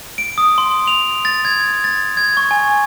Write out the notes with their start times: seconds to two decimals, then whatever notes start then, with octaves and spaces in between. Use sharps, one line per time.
0.18 D7
0.38 D#6
0.58 C6
0.88 F7
1.25 A6
1.45 G#6
1.84 A6
2.17 G#6
2.37 C#6
2.51 G#5